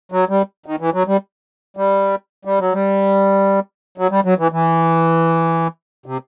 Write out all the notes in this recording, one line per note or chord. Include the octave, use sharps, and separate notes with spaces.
F#3
G3
D#3
E3
F#3
G3
G3
G3
F#3
G3
F#3
G3
F#3
E3
E3
C3